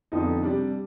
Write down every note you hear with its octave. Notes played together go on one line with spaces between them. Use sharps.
F2 D3 F3 B3 D#4
C3 G3 D4